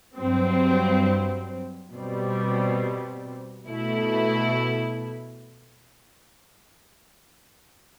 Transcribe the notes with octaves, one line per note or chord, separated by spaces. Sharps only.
G2 F#3 C4
B2 G3 C4
B2 A3 E4